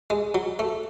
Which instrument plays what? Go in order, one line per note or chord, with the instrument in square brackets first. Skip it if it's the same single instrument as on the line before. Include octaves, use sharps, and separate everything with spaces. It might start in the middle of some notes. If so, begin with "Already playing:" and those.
[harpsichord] G#3
F#3
A3